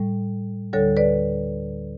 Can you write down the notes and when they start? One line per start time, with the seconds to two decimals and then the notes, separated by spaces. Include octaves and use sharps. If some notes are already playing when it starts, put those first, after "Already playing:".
Already playing: A2 G3
0.73 D2 D3 G3 A4 C#5
0.97 B4 D5